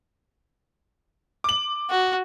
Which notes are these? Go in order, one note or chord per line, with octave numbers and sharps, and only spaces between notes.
D6 F#7
F#4